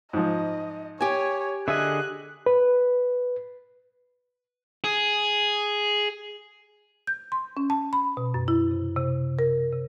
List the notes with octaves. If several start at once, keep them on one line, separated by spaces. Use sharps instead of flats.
G#2 F3 D#5
G4 C#5 G#5
D3 G#4 D#5 E5 F#6
B4
G#4
G6
C6
C#4
A5
B5
B2
F#2
E4
C3
C3
A#4
C3